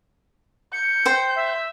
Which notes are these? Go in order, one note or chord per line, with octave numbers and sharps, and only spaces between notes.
G6 C#7
C5 G5
E5